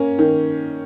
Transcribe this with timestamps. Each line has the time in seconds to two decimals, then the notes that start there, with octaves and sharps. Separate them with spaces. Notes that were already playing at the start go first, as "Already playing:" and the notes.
Already playing: A#3 C#4
0.19 D#3